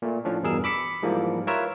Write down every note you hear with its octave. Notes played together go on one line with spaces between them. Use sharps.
A#2 A3
A2 F3 C#4 D4
E2 G2 B2 G#4 A#4 E6
B5 D6 E6 B6 C#7
G#2 E3 F3 G3 A#3
F4 A#4 B4 C#5 E5 E6